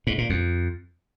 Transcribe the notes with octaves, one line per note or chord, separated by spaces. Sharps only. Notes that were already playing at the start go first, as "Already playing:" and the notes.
G#2
A#2
F2